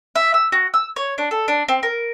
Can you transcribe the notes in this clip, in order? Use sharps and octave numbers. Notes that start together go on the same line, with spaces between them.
E5
E6
F#4
E6
C#5
D4
A4
D4
C4
A#4